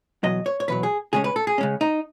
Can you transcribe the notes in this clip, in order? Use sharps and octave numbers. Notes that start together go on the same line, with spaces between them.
E2 B2 F#3 D#5
C#5
C#5
E2 B2 F#3 B4
G#4
C#3 G#3 C#4 G#4
B4
A4
G#4
C#3 G#3 C#4
D#4